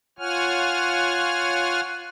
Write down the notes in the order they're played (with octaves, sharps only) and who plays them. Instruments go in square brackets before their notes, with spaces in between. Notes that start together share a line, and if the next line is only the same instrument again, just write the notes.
[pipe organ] F4 C#5 F#5 G#5 F6